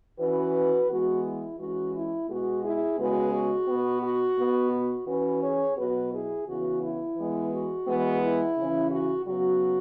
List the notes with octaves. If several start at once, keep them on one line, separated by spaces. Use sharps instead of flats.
E3 C#4 F#4 B4
E3 G#3 B3 F#4
E4
E3 G#3 C#4 F#4
E4
B2 G#3 B3 F#4
E4 G#4
C#3 G#3 B3 F#4 B4
F#4
B2 B3
F#4
B2 B3
F#4
E3 C#4 F#4 B4
G#4 C#5
B2 F#3 B3 F#4 B4
E4 G#4
C#3 E3 B3 F#4
E4
E3 G#3 B3
F#4
E3 G#3 B3
E4
C#3 E3 C#4
F#4
C#3 F#3 B3 F#4